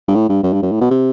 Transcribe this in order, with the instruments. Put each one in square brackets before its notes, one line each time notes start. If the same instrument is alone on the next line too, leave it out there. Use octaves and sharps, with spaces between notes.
[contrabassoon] G2
A2
G2
F#2
G2
F#2
A2
B2
C3